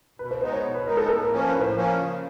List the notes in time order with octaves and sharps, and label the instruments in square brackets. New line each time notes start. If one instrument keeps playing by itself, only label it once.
[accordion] B2 [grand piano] B4
[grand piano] C5
[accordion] G#3 B3 D#4 [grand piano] C5
[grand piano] C#5
[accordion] B2
[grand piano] B4
[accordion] G#3 B3 D#4 [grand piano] A#4
[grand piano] A4
[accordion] A2 [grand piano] A4
[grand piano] A#4
[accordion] F3 A#3 C#4
[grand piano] C5
[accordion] A2 [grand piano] B4
[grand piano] C5
[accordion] F3 A#3 C#4
C#3